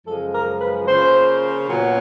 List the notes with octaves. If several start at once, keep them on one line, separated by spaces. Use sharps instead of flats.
F#2 C#3 F3 G#3 A4
A#4
B4
C#3 F3 A#3 C5
A#2 F#3 B3